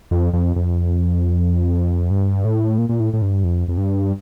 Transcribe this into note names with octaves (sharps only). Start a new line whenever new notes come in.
F2
F2
F2
G2
A2
A#2
A#2
A2
A2
G2
F2
F2
G2